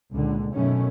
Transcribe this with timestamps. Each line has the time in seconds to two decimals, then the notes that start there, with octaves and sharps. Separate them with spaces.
0.12 C#2 A#2 D3
0.54 F#2 B2 D#3 A3 C#4